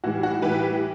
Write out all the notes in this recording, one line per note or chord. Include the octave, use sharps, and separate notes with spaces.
A2 E3 G3 F#4
F#4
A2 E3 G3 G4 B4